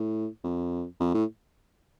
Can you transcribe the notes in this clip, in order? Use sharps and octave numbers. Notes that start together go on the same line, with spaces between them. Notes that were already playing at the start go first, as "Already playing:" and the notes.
Already playing: A2
F2
F2
A2